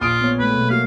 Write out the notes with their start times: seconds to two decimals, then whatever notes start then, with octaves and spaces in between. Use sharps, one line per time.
0.01 A#1 F4 D#6 D7
0.21 B3 C#5
0.39 G#3 A3 B4
0.55 B2 F#3 A#3
0.70 A#3 F#4 F5